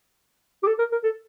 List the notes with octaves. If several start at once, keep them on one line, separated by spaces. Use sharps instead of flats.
G4
A4
A#4
A#4
A4